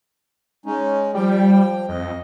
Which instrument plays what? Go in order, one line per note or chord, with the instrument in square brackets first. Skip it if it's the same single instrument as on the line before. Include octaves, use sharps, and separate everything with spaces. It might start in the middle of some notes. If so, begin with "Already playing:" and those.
[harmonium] G#3 C#4 D#4
[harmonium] F3 G5 [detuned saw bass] G3
[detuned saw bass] F2 [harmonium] D#5